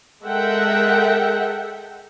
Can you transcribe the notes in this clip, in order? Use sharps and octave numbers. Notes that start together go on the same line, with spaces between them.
G#3 A4 A#4 E5 F#5 G5